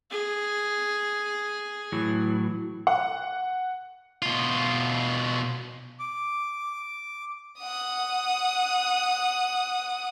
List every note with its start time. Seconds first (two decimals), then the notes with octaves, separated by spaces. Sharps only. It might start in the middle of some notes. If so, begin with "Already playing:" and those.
0.11 G#4
1.92 A2 E3 F#3
2.87 F#5
4.22 B2 F4
5.99 D6
7.60 F#5 D#6